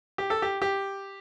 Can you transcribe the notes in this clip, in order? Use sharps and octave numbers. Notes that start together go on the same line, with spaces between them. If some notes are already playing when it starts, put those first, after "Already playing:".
G4
A4
G4
G4